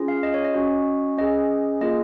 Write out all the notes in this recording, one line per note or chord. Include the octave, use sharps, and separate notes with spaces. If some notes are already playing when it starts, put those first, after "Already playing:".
Already playing: C#4 F4 G#4
F5
D#5
C#5
D#5
C#4 F#4
C#4 G#4 D#5
A#3 F4 G#4 D#5